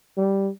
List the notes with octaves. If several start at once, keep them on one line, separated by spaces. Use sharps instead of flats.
G3